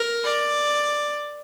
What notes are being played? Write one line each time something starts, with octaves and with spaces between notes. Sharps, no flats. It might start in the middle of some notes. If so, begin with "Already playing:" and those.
Already playing: A#4
D5